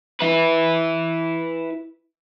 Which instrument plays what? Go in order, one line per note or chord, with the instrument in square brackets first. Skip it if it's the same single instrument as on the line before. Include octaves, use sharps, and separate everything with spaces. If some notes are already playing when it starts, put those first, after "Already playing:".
[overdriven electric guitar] E4 B4